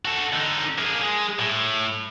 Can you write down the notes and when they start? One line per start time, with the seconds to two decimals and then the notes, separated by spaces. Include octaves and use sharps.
0.05 F#4 A4
0.33 D3 D#4
0.78 A#3 G#4
1.02 G#3
1.39 A2